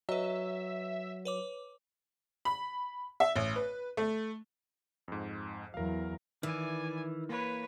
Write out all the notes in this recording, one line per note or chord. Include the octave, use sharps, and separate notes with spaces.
F#3 B4 D#5 E5
B4 C#5 D6
B5
E5
A1
B4
A3
F2 G#2
E2 F#3 A#4 F5
D#3 E3 D5 G#5
A#3 B4 C#5